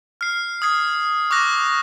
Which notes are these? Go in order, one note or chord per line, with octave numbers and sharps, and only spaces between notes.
F6 C7
D#6 G#6 C7
C#6 D6 F6 F#6 A#6